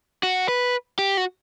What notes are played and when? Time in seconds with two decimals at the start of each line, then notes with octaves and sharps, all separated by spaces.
0.23 F#4
0.48 B4
0.99 G4
1.17 F#4